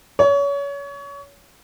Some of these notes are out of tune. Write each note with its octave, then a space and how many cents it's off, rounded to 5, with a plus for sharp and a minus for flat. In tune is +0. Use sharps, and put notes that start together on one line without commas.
C#5 +30